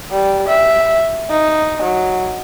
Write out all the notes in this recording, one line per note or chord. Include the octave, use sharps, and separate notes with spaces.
G3
E5
D#4
F#3